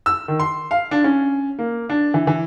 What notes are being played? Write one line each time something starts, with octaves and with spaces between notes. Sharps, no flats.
E6
D#3
C6
F5
D4
C#4
A#3
D4
E3
E3